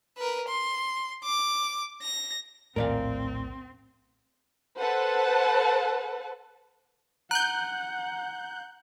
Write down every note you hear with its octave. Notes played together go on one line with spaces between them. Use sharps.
A#4 B4
C6
D6
A#6
A#1 D#2 A2 C4 A#4 D5 F5
A4 B4 C5 F#5 A5
F#5 A#5 F#6 G6